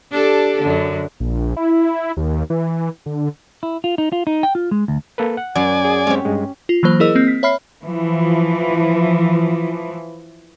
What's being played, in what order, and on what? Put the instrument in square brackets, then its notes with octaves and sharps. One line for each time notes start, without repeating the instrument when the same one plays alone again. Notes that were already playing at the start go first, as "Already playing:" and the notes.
[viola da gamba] D4 G4 A4
F#2 D3
[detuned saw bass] A#1
E4
D#2
E3
D3
[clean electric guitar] E4
F4
D#4
F4
D#4
G5
F4
G#3
D2
[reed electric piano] A#3 A4 B4
F#5
[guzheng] F#2 F#3 [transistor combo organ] D5 G#5
[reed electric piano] G#4
[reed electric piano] G#3 C4 [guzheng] C#4 G4
[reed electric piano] G2 G#3
[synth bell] F4
E3 F#3 A#3 C5
E4 G#4 A#4 D#5 E6
A#3 C4
B6
C#5 E5 B5 F6 C7
[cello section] E3 F3